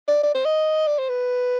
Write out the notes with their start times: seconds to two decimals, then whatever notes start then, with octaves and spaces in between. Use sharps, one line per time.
0.08 D5
0.23 D5
0.34 C5
0.45 D#5
0.87 D5
0.98 C5
1.09 B4